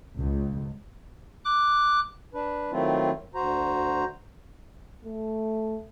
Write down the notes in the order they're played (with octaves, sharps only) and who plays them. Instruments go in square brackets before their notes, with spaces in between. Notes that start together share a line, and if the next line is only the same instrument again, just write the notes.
[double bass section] C#2
[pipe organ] D6 F#6
[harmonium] D4 B4
D#3 F#3 A3 C4 E4 F4
D2 F#4 C5 A#5
[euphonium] A3